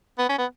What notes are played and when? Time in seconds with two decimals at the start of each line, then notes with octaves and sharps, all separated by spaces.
0.19 B3
0.29 C#4
0.38 B3